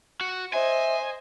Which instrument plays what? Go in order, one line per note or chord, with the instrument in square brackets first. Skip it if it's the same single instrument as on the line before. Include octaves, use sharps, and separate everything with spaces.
[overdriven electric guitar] F#4
[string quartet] C5 D#5 [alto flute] E5 [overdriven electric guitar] G#5